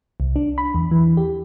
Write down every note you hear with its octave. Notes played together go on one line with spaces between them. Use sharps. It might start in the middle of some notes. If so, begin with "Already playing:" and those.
C2
D4
B5
E2
E3
G4